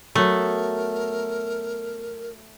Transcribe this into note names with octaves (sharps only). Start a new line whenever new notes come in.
F#3 A3 B3 A#4